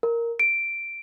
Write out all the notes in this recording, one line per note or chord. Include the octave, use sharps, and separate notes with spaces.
A#4
D7